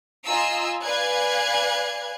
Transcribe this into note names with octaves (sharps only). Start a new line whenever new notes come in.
F4 D#5 G#5 A#5 E6
B4 D5 F5 G#5 F#6 G#6